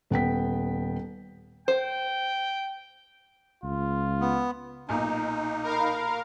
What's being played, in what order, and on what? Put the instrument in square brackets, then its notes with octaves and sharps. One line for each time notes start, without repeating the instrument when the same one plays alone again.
[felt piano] D#1 B3 G5 B6
[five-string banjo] C5 [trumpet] G5
[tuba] C#2 [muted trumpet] F4
[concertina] B3
[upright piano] B1 A#2 G#5 [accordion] D#4
[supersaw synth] A#4 F5 [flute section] A#5 B5